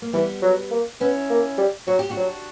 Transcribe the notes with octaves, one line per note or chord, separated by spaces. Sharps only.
A#3
E3 G3 B3
F#3
A#3
B3 C#4 E4
A#3
G3
F#3 F#4
G4
D4 F#4
F#3